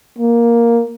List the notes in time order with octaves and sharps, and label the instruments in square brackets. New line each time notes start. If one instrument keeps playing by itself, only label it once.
[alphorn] A#3